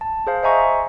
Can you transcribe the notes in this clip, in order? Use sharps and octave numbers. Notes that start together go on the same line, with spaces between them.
A5
G#4 C5 F5
C5 D#5 E5 G#5 A#5 C#6